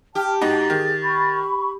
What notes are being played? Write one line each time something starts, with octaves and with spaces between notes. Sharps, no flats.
G4 G5 A5 F6
G#2 D#4 F#4 A6
D#3 G#4
B5 C#6